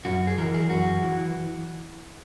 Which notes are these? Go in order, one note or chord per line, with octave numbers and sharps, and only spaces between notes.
F#2 F#4
G#4
E3 A#4
G#4
F#2 F#4
E3